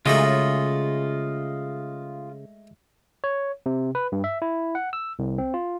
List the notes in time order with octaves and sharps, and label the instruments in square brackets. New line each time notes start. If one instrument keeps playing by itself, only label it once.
[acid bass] C#3 [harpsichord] G#3 A3 F#4 [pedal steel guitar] F4 D#5
[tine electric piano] C#5
C3
B4
G2
E5
E4
F#5
E6
C2
C4
F4